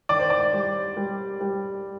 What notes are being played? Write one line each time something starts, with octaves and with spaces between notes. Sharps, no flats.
D#3 D5
C5
D5
G3
G3
G3